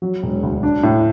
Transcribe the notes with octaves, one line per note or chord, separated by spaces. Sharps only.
F#3
E1
D2
D4
A2